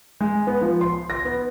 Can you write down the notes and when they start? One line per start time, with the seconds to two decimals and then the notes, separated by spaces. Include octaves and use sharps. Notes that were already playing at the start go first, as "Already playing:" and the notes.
0.20 G#3
0.47 B3
0.61 F3
0.81 C6
1.10 A#6
1.25 B3